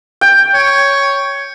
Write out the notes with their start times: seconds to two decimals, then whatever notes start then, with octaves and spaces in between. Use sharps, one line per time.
0.21 G5
0.54 C#5